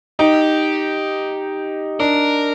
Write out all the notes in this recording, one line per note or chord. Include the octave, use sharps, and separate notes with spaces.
D#4 G4
D4 A#4